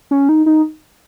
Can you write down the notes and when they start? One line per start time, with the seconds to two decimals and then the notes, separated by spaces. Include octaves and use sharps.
0.11 C#4
0.29 D#4
0.46 D#4